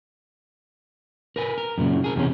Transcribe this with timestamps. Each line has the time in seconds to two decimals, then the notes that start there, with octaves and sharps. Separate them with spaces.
1.36 A#4 B4 G#5
1.58 A#4
1.78 F#2 A#2 C#3
2.04 G#4 A#4
2.16 E2 C3 C#4